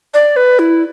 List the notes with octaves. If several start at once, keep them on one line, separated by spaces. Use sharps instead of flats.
D5
B4
E4